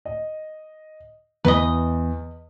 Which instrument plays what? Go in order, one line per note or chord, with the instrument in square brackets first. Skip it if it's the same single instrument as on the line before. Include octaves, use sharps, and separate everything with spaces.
[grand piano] D#5
[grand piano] E2 [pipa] B4 D#5